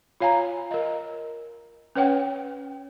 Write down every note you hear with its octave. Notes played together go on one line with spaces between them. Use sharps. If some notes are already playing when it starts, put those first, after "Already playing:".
F4 C#5 F5 G#5 A#5
A#4 D#5
C#4 B4 C#5 F#5 G5